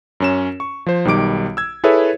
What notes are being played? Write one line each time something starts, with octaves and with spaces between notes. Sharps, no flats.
F#2 C#4 E7
C#6
F3 C5
B1 D#3 G3 D6 D7
E6 G#6
E4 G#4 A4 B4 C#5 E5